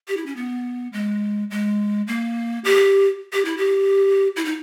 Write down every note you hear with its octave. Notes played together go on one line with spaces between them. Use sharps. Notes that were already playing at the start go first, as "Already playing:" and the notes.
G4
E4
C#4
B3
G#3
G#3
A#3
G4
G4
E4
G4
E4
D#4